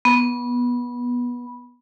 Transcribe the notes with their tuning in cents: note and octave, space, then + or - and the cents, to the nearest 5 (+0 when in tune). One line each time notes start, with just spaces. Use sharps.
B3 -20